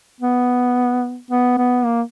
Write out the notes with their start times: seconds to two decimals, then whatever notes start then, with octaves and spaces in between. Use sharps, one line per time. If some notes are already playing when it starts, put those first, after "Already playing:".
0.21 B3
1.31 B3
1.58 B3
1.85 A#3